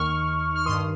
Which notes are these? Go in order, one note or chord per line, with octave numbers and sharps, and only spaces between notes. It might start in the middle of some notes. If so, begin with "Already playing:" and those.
Already playing: D#2 D#3 C#6 F6
F6
G2 D#3 C6 D#6